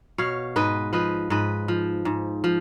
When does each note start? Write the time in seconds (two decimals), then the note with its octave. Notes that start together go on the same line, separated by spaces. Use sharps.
0.18 B2 C#5 F5
0.56 G#2 B4 D#5
0.93 F3 B4 D#5
1.30 G#2 B4 D#5
1.68 F3
2.05 G#2
2.44 F3